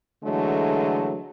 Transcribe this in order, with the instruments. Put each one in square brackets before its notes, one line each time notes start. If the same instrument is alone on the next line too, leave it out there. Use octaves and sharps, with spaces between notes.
[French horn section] D3 E3 F#3 G#3 A3